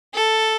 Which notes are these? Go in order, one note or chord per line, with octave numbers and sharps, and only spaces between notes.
A4